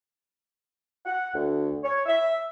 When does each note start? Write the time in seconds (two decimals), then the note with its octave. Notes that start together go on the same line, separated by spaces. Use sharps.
1.05 F#5
1.34 D2
1.83 C#5
2.06 E5